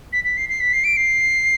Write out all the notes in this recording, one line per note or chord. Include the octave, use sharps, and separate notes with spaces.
B6
B6
C7
C7
B6
C7
D7
C7